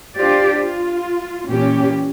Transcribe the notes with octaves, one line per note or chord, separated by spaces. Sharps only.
D4 F4 G4 C5 D5
F4
A#2 E3 C#4 G4